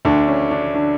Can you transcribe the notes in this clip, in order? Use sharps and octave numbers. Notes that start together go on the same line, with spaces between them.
D2 D3 D4
C#4
D4
D3 D4